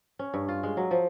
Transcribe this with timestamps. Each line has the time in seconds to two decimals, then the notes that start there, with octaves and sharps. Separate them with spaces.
0.19 C#4
0.34 G2
0.49 F4
0.63 G#3
0.77 F#3
0.91 F3